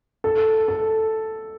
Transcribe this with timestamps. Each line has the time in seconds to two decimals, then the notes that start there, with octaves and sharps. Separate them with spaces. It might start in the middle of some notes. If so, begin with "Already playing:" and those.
0.24 A4
0.68 A4